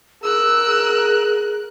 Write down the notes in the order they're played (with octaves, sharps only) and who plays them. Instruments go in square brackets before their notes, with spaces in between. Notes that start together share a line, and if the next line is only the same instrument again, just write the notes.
[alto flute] G#4 [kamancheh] A#4 F#6 [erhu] E6